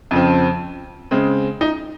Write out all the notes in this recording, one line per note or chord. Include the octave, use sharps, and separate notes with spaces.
F2 C#3 F3 C4
C#3 G#3 C4
D#4